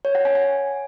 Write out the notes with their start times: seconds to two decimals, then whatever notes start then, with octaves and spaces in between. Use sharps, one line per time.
0.05 C#5
0.15 F#5
0.25 G#5
0.35 G#5